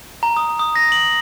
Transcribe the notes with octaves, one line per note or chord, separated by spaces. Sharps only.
A#5
D#6
D#6
A#6
F#7